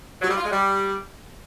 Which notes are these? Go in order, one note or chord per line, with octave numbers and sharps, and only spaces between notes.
F#3
G3
F4
G#3
G3